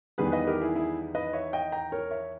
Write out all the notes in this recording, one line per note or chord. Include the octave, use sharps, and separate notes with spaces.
E2 D#3 G3 B3 G#4 B4
B4 D#5
G4 A#4
E4 G#4
E4 G#4
B4 D#5
C#5 E5
D#5 G5
G5 A#5
A#4 C#5
C#5 E5